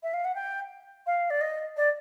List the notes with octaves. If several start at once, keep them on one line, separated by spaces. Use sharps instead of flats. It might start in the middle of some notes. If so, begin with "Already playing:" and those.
E5
F5
F#5
G5
F5
D5
D#5
D5